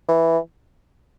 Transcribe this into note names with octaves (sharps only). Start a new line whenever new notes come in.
E3